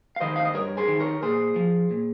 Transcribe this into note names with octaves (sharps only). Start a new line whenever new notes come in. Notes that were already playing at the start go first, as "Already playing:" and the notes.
F5
D#3 C5 D#5
F5
D#5
G2 A#4 C#5
G#4 C5
D#3
A#4 C#5
A#2 G#4 C5
F3
A#2